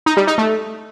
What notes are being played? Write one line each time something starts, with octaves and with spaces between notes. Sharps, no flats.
D#4
G3
D#4
A3